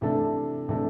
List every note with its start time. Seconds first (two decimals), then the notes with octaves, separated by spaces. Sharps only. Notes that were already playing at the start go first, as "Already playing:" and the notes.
0.01 C3 E3 A3 D4 A4
0.69 C3 E3 A3 D4 A4